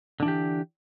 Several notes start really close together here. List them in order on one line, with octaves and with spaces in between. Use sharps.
D3 D4 E3 G4